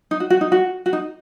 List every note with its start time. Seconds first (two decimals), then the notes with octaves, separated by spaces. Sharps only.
0.11 D#4
0.20 F#4
0.30 F#4
0.41 D#4
0.52 F#4
0.86 F#4
0.93 D#4